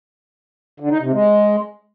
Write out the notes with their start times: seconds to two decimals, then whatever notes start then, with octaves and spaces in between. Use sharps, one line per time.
0.80 D3
0.91 D#4
1.02 C3
1.13 G#3